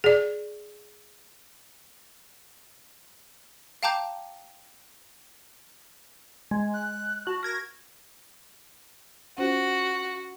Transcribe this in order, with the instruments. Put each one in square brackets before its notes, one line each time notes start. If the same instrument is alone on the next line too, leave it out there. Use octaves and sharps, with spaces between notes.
[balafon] G#4 D5
[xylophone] F5 G5 A5 A#5 D6 G6
[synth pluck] G#3
[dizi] F#6
[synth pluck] F#4 [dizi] A5
[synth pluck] A#4 G#6 A#6
[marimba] C#4 F4 C5 [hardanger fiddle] F#4